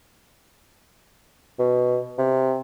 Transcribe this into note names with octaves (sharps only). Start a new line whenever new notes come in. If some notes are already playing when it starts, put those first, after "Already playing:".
B2
C3